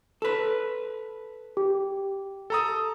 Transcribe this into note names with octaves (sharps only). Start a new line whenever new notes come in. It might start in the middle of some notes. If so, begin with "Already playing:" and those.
A4 B4
G4
A4 A#5 D#6